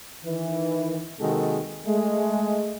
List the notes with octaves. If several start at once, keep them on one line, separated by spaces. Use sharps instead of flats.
D#3 E3
C3 D#3 G#3 A#3 F#4 A4
G#3 A3